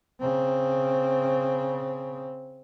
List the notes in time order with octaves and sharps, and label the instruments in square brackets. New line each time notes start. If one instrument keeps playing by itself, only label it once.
[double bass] C#3 C4